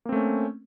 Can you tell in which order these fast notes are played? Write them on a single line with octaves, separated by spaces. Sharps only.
A#3 C4 A3 C#4